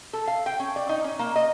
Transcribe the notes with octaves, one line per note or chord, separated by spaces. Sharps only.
A4
F5
G5
C#4
D5
D#4
C#4
A#3
D#5